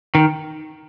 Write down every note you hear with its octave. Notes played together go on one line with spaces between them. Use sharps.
D#3